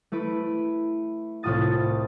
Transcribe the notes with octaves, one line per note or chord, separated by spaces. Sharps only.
A3 E4 B4 D7
C2 A2 F4 A5 D#6 A6